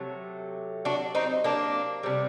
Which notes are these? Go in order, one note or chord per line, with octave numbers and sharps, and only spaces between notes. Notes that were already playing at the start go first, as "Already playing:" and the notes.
Already playing: C3 F#3 A3
D4 F#4
C4 D#4
A#3 D4
C3 G3